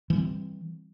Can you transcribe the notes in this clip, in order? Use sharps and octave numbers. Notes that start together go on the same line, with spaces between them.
E3 F#3 G3 C4